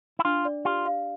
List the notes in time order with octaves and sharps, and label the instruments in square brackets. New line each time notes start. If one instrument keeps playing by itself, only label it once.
[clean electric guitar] E4
[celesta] D4 [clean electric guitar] F4
[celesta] D5
[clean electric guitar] F4 [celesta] G4
[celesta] F5